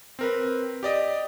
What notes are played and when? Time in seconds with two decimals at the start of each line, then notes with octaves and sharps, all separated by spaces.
0.19 C4 A#4 B4
0.83 G4 D5 D#5